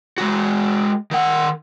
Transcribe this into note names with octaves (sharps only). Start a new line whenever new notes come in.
G#3 F#4
D#3 F#5